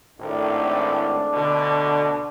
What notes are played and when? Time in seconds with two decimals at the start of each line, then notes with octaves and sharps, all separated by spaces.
0.19 G#1 A2 D4
1.34 D2 B2 D3